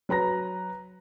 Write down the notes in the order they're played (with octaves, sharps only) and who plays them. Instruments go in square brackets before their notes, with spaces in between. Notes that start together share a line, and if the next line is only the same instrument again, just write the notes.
[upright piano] F#3 B4 A#5 A#6